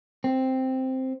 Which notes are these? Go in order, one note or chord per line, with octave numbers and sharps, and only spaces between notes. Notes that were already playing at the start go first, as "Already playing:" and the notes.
C4